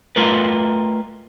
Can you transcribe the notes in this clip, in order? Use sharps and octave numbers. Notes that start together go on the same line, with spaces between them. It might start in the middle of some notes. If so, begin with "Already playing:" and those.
A3 F4 A#4 B4